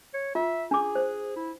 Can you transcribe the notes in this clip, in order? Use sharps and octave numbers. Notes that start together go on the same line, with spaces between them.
C#5
F4 E5
D4 G#4 D6
C5
E4